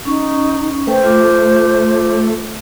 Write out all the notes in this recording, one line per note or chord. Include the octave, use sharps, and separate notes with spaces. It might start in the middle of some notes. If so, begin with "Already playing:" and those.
C#4 D#4 C#6
A3 B4 C5 G5
F4 D6